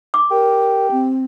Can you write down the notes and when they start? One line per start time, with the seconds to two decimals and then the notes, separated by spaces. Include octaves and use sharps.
0.14 D6
0.31 G4 A#4
0.91 C4